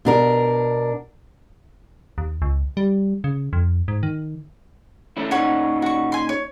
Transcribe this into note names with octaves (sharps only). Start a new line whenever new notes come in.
B2 D4 A#4
D#2
C#2
G3
C#3
F2
G#2
D#3
A3 C#4 E4
A#2 C#4 D#4 C#5 F#5 C#6
F#4 C#6
G#5 C6
C#5